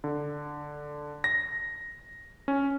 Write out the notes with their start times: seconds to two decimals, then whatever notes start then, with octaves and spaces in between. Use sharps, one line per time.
0.04 D3
1.24 A#6
2.48 C#4